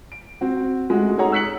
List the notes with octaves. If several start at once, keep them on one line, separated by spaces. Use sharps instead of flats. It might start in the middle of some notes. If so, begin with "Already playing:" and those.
D7
C4 F#4
G#3 A3 F#4
D#4 G#4 A4 C#5 F#5 A#5
E6 F#6 B6 C#7 F#7